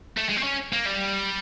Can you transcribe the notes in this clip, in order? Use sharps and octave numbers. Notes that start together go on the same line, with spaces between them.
A3
G#3
C4
C#4
A#3
G3